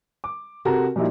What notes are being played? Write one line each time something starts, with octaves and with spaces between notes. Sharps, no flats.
D6
C3 F#4 A4 A#4 A#5
A#2 F3 G3 D#4 E4 F#4